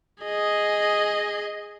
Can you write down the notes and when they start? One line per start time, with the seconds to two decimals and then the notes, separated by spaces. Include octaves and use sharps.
0.23 G#4 D#5